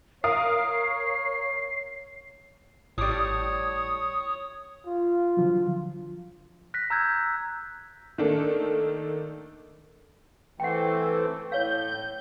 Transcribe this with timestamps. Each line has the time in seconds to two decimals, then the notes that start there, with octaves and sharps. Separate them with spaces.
0.24 A#4 C#5 F5 D#6 C7
2.98 G#1 A2 G3 C#5 D6 D#6
4.86 F4
5.37 D3 F3 F#3
6.74 F#6 A#6 B6
6.90 A#5 E6 G6 G#6
8.18 D#3 A3 A#3 D4 A4
10.60 E3 A3 C4 F#5 G5
11.52 A2 C#5 F5 G6